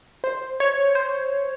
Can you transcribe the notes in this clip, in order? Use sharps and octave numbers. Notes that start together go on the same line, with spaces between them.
C5
C#5
C5